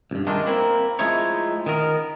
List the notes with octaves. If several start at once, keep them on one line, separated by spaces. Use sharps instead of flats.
C#2 G2
D#3 G#3 A3 D4 D#4 F4
A#3 C4 E4 A#4 B4
F3 G#3 A3 D#4 E4 C#5
D#3 B3 A#4